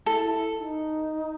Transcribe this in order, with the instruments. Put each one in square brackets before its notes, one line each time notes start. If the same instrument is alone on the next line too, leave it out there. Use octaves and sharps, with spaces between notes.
[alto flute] E4 [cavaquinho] A4
[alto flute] E4
D#4